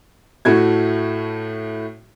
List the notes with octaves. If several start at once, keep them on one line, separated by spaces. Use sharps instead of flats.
A2 A3 F#4 G#6